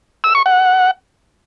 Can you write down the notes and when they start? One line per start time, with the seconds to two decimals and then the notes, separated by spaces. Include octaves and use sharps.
0.24 E6
0.35 C#6
0.46 F#5